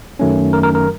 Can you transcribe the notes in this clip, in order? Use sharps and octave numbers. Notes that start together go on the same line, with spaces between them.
F#2 D#3 F#3 A3 C#4
A#4
A#4
A#4